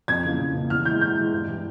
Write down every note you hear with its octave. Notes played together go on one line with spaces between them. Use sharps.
F2 G#6
C#3 E3 A#3
F2
C#3 E3 A#3
E2 F6
E3 G#3 E4 G6
E2 G6
E3 G#3 E4
G2
E3 G3